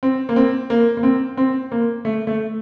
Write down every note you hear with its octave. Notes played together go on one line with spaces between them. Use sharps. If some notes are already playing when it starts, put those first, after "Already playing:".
C4
A#3
C4
A#3
A#3
C4
C4
A#3
A3
A3